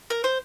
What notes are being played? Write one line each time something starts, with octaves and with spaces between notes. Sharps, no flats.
A#4
C5